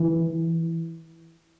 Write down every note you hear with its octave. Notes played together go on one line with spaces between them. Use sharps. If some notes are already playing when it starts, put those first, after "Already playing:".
Already playing: E3